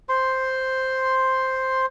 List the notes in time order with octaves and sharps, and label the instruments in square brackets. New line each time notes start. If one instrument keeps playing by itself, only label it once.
[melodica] C5 C6